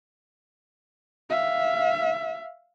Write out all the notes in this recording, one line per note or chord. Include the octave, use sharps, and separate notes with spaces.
E5 F5